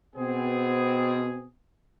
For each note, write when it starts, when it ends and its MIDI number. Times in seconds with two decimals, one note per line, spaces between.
0.16 1.45 47
0.16 1.45 59
0.16 1.45 60
0.16 1.45 68